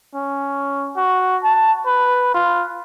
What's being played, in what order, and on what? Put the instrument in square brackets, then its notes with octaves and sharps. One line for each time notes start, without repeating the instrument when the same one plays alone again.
[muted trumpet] C#4
F#4
A5
B4
F4